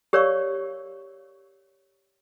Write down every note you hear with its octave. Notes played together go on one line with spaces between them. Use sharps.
G4 A#4 C#5 D5 F5 C#6